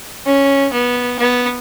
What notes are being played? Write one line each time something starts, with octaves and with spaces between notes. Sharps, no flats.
C#4
B3
B3